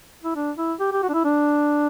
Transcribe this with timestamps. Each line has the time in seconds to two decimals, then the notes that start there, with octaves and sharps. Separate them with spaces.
0.24 E4
0.36 D4
0.58 E4
0.80 G4
0.92 G4
1.03 F#4
1.09 D4
1.14 E4
1.25 D4